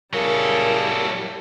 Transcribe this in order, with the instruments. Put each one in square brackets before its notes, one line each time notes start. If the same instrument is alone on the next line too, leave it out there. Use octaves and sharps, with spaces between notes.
[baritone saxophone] C#3 [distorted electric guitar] F#3 A4 [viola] G3 E4 [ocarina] A#4